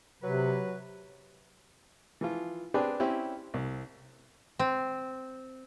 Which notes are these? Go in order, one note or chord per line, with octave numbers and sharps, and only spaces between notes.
C3 F#3 B4
E3 F3 F4
C4 D4 G4 G#4 B4
C4 C#4 E4 G4
C2
C4